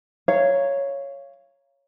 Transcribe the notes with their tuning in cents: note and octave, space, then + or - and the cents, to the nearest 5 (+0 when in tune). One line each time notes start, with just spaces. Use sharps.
C#5 +0 F5 -20 A#5 +0